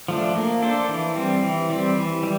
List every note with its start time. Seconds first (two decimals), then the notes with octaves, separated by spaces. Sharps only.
0.08 F3 A3 D4
0.35 A#3
0.62 D4 A4 C5
0.89 E3
1.16 G3 C4
1.43 E3
1.70 G3 C4
1.96 E3
2.23 G3